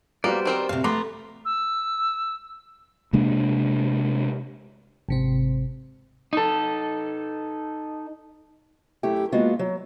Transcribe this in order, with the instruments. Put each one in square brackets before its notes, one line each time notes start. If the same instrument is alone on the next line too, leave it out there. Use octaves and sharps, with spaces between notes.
[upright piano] G3 B3 F#4 [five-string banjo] A#3 [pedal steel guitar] C5 D5
[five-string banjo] D#3 C4 A#4
[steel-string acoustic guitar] A2 C3 [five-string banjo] F5
[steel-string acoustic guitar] A3 [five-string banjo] B3 [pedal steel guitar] A#5 C6 [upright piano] D6
[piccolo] E6
[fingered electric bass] C3 G#3 A#3 D4
[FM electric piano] G#1 C3 C4
[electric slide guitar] D#4 A4
[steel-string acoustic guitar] F#2 A3 E4 G4
G#3 A#3 B3 F4 F#4
F#3